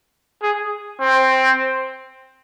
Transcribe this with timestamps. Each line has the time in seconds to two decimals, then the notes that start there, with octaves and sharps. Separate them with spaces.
0.42 G#4
1.00 C4